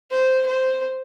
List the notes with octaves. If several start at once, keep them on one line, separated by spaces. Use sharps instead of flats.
C5
C5